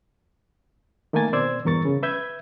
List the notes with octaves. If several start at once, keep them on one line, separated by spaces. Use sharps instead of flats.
D#3 A3 A#3 A#4 G#5 A6
B2 C4 C5 D5 E6 G#6
E2 G2 A#4 C#6 A6
C#3
B4 E5 G6 G#6